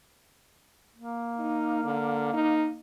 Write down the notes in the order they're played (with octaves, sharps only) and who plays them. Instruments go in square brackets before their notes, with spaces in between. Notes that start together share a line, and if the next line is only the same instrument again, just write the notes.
[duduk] A#3
[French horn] D#4
D3
D#4